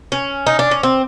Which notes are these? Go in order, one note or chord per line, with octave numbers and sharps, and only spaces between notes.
C#4
D#4
D4
C#4
C4